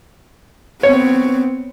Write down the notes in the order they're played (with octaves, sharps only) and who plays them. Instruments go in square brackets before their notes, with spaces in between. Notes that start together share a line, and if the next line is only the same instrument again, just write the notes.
[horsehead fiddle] B3 C4 [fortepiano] C#5